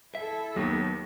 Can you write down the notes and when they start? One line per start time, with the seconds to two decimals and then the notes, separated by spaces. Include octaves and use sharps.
0.15 E4 A4 E5
0.56 D#2 F#3 B3